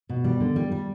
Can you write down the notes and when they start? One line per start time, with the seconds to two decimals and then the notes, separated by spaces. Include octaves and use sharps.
0.09 B2
0.24 G3
0.40 D3
0.56 G3
0.72 G3